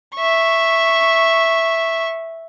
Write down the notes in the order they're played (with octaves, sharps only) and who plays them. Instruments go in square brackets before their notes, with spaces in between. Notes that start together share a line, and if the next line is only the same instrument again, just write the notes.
[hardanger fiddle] E5 C#6